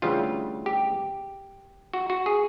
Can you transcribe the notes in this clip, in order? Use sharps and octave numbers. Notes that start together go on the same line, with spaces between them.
D2 C#3 E3 G3 F4
G4
F#4
F#4
G#4